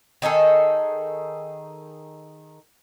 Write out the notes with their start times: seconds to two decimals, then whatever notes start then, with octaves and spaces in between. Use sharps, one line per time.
0.22 D#3 D#4 G#4 A4